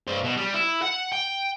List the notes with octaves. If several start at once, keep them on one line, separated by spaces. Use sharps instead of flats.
G2 C5
B2
G3
E4
F#5
G5